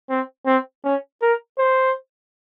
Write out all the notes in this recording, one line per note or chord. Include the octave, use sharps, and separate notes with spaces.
C4
C4
C#4
A#4
C5